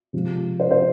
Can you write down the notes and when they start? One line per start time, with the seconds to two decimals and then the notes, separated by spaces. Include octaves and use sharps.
0.13 C3 F3 G#3
0.60 C5
0.71 C5